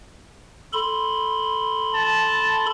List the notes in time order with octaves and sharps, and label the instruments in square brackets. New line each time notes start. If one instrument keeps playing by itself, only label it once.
[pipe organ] A4 B5 C6
[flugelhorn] A5